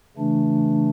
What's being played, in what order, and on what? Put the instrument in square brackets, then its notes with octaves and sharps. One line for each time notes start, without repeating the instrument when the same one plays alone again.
[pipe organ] C#3 E3 A3 D4